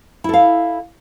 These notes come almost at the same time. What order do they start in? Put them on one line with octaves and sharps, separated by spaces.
E4 A4 F5